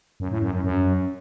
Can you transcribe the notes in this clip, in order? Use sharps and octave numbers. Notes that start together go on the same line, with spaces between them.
F#2
A2
F#2
F#2
F#2